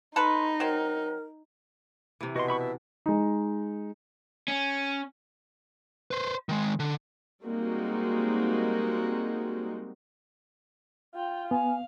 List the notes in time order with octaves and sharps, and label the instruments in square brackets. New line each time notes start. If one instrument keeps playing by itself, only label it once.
[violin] D#4 [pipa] A4 B4 [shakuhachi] C6
[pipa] F#3 C4 [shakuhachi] A#4
[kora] C3 E3
[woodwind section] B2 [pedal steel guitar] F#4 C6
[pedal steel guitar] E5 B5 C#6
E5
[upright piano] G#3 D#4
[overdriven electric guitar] C#4
[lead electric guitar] B4 C5
D#3 G#3
D3
[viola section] G3 G#3 A#3 C4 D#4 F#4
[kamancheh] F4 G5
[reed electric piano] B3 [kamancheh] F5 [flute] G#5